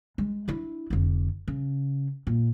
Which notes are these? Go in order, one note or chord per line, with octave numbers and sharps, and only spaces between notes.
G#3
D4 E4
F1 D3
C#3
A#2